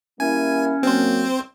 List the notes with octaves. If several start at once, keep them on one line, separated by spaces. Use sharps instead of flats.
G3 A#3 C#4 E4 G#5
F#3 A#3 C4 C5